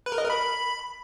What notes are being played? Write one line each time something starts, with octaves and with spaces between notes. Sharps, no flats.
B4
A#4
D#5
A#4
B5